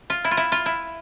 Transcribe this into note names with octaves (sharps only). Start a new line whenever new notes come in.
F4
E4
F4
E4
F4
E4